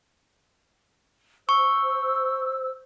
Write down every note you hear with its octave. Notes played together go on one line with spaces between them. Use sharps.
C5 C#6 E6